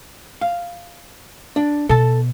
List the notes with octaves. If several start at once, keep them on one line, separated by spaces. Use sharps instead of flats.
F5
D4
B2 A4 A5